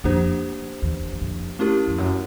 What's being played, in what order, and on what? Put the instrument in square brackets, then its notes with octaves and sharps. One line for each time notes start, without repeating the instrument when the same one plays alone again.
[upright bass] F2 [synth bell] A#3 D4 G4 C5
[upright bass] E2
E2
F2
[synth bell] A3 C#4 E4 G4 A#4
[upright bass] F2
F#2